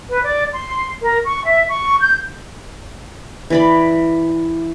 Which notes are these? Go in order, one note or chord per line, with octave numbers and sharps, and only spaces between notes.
B4
D5
C6
A#4
C#6
E5
C#6
G6
E3 D5 B5